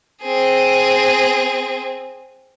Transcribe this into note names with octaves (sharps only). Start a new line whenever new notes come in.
C4 G#4